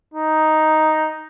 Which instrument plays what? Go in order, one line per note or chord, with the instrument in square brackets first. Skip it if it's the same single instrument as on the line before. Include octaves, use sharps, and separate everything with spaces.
[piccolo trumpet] D#4